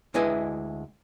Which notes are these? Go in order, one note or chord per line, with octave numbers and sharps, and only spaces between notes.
D2 G#3 E4 B4 D#5 G#5